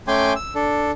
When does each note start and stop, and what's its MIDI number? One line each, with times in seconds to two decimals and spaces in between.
0.08 0.33 57
0.08 0.33 61
0.08 0.33 79
0.08 0.33 80
0.08 0.33 84
0.08 0.33 86
0.36 0.54 88
0.55 0.91 62
0.55 0.91 69